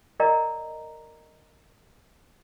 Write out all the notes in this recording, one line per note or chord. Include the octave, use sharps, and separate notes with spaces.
A#4 D5 D#5 G5 A#5